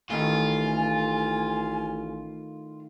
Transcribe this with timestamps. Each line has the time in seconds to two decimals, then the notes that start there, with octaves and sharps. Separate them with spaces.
0.10 A1 A2 D#3 F4 G#5